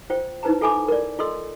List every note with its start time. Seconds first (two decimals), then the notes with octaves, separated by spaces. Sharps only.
0.10 F4 C5 G5
0.43 D#4 E4 B4 C5 A5 A#5
0.61 F4 A4 E5 G#5 B5 D6
0.88 A#4 D5
1.19 F4 A4 D#5 C6 E6